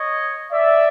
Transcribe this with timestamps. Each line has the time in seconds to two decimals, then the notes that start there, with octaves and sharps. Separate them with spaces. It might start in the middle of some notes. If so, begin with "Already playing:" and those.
Already playing: C#5 D#5
0.50 D5 E5